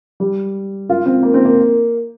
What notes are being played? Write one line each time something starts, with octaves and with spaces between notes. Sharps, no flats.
G3
F4
C4
A#3
C4
A#3